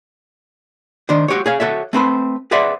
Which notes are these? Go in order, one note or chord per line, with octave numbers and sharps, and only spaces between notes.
D#3 D4 C5
F#4 G4 C5 C#5
G#4 C#5 F5
F#4 A4 C#5 E5
A3 C4 B4 C5
G#4 B4 C5 D5 E5 F#5